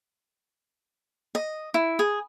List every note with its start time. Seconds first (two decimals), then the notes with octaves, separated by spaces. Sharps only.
1.35 D#5
1.74 E4
1.99 G#4